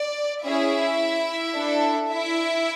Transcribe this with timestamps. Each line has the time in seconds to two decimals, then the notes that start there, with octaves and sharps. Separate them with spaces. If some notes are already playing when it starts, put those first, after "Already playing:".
Already playing: D5
0.43 C#4 E4 G#4 E5
1.55 D4 A4
2.10 E4 E5